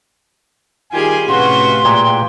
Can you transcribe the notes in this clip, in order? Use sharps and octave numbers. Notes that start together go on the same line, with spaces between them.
D#3 G3 F4 G4 G#4 G#5
A2 C3 C#4 F4 F#4 B4 C6
A#2 G#3 G5